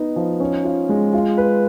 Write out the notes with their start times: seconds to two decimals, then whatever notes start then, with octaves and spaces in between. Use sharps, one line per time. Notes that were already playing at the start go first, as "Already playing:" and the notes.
Already playing: B3 D#4
0.16 F3
0.40 C#4
0.64 F4
0.89 G#3
1.13 F4
1.38 B4